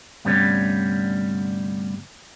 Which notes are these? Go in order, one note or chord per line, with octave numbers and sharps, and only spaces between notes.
D2 G2 C3 G3 B3 C#4